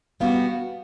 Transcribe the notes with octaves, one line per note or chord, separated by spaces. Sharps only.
G3 B3 D4 F#4 F5